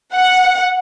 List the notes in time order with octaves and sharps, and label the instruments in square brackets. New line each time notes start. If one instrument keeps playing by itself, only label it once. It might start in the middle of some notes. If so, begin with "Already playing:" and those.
[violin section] F#5